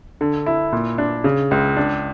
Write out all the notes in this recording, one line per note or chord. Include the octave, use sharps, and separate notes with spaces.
D3
E4
A#2
D4
C#3
C#2
D4